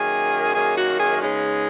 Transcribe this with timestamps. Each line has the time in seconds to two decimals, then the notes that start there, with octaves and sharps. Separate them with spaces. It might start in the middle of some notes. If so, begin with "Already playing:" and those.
Already playing: F#2 D#3 A#3 G#4
0.53 F#2 D#3 A#3 G#4
0.76 F#4
0.98 G#4
1.21 C#3 G#3 B3 D#4